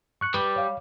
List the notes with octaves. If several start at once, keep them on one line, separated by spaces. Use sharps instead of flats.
C#6 F#6 C#7
G3 B4
C#5 F5